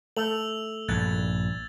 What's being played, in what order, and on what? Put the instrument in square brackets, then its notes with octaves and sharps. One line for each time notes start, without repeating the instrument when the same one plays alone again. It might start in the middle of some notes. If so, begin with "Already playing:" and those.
[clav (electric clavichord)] A3 [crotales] E6 F7 F#7
[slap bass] A#1 G2 [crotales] F#6 G#6 A6